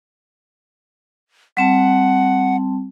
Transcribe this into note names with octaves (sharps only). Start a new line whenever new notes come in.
G3 C4 F#5 A5